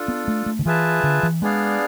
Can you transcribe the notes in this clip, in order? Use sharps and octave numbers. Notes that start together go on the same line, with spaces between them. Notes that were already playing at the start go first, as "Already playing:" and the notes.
Already playing: D4 F4 A4
B3
A3
A3
D3
E3 F4 G#4 B4 E5 A5
D3
E3
G#3 B3 D4 G#4 D5 F5